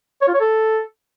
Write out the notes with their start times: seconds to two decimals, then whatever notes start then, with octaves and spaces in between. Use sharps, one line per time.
0.22 C#5
0.28 F4
0.34 C#5
0.40 A4